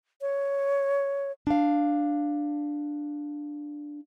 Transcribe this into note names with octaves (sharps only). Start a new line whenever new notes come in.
C#5
D4 F5